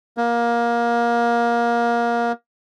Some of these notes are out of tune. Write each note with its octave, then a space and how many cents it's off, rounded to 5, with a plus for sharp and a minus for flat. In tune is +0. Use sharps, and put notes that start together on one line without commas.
A#3 +20